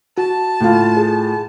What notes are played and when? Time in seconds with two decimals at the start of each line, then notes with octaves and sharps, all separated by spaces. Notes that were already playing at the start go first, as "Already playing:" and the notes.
0.18 F#4 A5
0.61 A2 F4
0.97 G#4